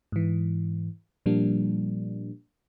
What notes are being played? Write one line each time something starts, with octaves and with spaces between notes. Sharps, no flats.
G#2 E3
A#2 F3 G3 A#3 D4